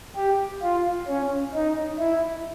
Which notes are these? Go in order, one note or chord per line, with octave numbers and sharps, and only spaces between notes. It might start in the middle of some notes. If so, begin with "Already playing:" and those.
G4
F4
C#4
D#4
E4